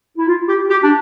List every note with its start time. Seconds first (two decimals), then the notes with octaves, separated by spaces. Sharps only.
0.18 E4
0.28 F4
0.48 G4
0.70 G4
0.84 D4